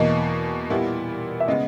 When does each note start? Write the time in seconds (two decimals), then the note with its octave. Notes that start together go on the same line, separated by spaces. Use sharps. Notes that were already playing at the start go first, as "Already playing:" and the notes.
Already playing: E2 B2 A#3 D#5
0.70 A#2 G3 B3 E4
1.40 E5
1.48 C#3 G#3 B3 D#5